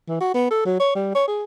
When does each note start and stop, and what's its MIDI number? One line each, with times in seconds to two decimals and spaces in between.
0.08 0.16 52
0.20 0.31 66
0.34 0.46 59
0.51 0.64 69
0.65 0.79 54
0.80 0.91 73
0.95 1.12 55
1.15 1.26 73
1.27 1.44 68